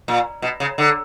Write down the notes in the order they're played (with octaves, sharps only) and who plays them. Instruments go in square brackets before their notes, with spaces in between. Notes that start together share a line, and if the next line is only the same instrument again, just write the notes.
[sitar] A#2
B2
C#3
D3